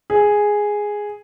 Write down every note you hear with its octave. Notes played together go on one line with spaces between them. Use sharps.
G#4